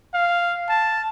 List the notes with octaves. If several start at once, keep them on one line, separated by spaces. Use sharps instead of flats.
F5
A5